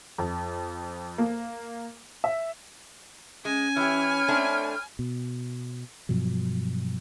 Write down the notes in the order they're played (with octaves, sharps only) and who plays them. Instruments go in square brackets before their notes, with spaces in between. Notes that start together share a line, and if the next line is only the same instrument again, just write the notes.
[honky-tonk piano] F2
A#3
E5
[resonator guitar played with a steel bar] G#3 [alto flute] C#4 [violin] G#5
[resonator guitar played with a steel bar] E3 G4 [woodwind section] C#5 B5 F6
[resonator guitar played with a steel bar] A3 C4 D4
[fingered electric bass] B2
G2 B2 F3 F#3